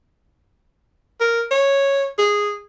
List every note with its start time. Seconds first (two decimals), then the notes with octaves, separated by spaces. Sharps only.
1.21 A#4
1.51 C#5
2.18 G#4